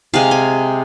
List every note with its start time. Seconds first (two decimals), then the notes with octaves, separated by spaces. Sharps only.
0.14 C3 G#3 F5
0.31 G#5